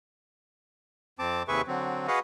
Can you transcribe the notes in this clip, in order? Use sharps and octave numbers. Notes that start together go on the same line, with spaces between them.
F2 C4 A5 D6
D#2 C3 G#4 B4 E5 C#6
D3 F#3 C4
F#4 G#4 B4 D#5 F5 F#5